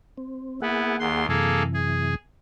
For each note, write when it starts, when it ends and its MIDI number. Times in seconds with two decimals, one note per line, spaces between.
0.17 0.60 60
0.62 1.26 58
0.62 0.96 59
0.62 0.96 64
0.62 1.26 68
0.62 1.26 78
0.99 1.26 39
0.99 1.26 84
1.29 2.16 42
1.29 2.16 48
1.29 2.16 52
1.29 1.63 58
1.29 1.63 68
1.29 1.63 69
1.74 2.14 68